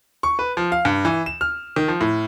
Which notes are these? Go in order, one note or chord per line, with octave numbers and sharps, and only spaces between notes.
C#6
B4
F3
F5
G2
E3
E7
F6
D#3
F3
A2